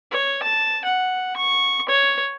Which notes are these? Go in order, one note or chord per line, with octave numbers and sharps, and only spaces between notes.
C#5
A5
F#5
C#6
C#5